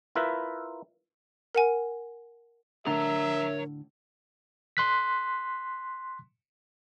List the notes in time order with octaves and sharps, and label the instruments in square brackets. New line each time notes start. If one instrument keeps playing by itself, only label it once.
[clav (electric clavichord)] E4 F4 A#4 B4 E5
[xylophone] A#4 F#5 G#5
[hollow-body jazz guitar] A2 D3 D4 [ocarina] A#4 [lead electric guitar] C#5 A#5 [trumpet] E5
[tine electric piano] C6 F#6 B6